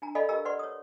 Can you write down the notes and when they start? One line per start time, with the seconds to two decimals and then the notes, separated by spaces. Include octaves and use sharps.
0.02 D4 G#5 A#5
0.15 A4 D5 D#5 F5 G#5 B5
0.29 G4 A#4 D#5 G#5 A#5 E6
0.45 B4 D5 F#5 C6 C#6
0.59 C#5 D#6